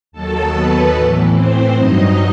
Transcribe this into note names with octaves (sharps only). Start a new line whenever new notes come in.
D#2 D#3 F#3 A4 A5
B3 B4
A2 E3
C4 C5
G2 F#3 D#4 D#5